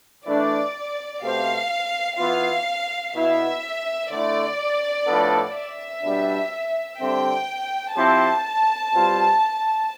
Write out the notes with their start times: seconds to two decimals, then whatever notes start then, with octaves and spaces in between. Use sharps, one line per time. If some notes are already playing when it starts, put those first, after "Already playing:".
0.25 E3 A3 D4 D5
1.21 B2 A3 C4 G4 C5 F5
2.18 E3 B3 F4 F5
3.14 B2 B3 E4 E5
4.10 D3 A3 E4 D5
5.06 A2 F3 B3 D4 A4
5.55 E5
6.03 B2 G3 D4
6.99 D3 G3 C4 G5
7.96 F3 C4 E4 G4 C5 A5
8.92 B2 G3 C4 F4